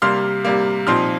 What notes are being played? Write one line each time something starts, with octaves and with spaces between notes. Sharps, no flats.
C3 G3 A#3 C6 F6
C3 G3 A#3
A#2 F3 C4 D#4 C6 F6